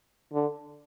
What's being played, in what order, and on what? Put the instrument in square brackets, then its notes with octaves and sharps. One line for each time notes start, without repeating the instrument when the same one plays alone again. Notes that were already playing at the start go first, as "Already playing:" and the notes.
[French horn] D3